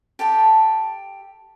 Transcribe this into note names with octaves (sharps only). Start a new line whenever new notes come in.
G4 A4 G5 A5